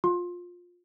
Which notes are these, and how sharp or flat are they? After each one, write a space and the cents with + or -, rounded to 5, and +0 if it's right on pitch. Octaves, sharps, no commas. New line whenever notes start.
F4 +20 C6 +25